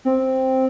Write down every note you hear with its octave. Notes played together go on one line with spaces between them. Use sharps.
C4